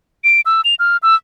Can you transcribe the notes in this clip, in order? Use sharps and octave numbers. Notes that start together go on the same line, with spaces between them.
D7
E6
F7
F6
E6